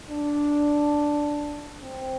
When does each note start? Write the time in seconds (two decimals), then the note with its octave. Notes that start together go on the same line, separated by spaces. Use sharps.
0.10 D4
1.81 C4